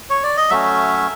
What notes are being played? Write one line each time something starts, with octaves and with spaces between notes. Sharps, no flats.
C#5
D5
D#5
F#3 A3 C#4 E5